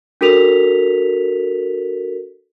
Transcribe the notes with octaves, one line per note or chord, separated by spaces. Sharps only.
D4 F#4 A4 A#4 B6 F7